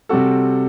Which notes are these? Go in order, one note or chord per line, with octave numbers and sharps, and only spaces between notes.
C3 G3 C4 F#4 A4